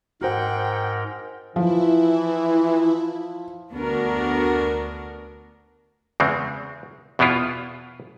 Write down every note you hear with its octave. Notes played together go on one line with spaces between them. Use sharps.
G#2 F#4 A#4 C5 F#5 G5
E3 F3 E4
D2 B3 D4 F#4 A#4
E2 C#3 G#3 C4
E2 B2 B3 E4 F4